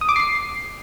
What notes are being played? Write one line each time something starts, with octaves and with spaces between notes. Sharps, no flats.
D#6
D6
C7